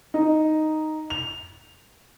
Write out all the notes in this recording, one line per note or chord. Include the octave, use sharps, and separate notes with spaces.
D#4
F7